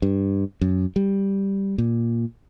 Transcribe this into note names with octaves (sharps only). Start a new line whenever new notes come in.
G2
F#2
G3
A#2